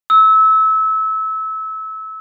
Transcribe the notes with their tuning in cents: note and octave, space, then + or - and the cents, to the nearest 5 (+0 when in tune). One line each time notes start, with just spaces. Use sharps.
E6 -25